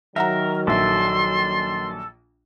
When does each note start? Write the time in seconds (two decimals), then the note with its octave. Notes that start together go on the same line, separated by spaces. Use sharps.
0.16 D#3 F#3 A#4 E5 F#5 A#5
0.67 A#1 A4 E5 C6